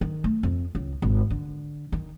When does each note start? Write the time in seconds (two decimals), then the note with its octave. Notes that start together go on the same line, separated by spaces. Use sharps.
0.01 D#3
0.24 A3
0.43 F2
0.75 C#2
1.02 G#1
1.30 D3
1.92 D#3